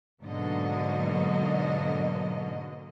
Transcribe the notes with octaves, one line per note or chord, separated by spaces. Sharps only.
G#2 B2 D3 F#3 A#3 D#5